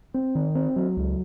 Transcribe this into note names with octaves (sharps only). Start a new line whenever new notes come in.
C4
D#3
C4
F#3
C#2